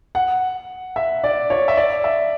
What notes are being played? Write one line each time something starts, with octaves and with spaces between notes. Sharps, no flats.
F#5
E5
D5
C#5
E5
D5
E5